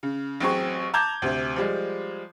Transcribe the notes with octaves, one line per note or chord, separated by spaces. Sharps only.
C#3
A1 F#3 C4 G#4 C#6
A5 A#5 D6 G6 G#6
D2 C3
F3 G3 G#3